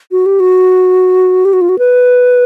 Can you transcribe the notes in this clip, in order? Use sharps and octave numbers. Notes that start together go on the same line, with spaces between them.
F#4
G4
F#4
G4
F#4
F4
F#4
B4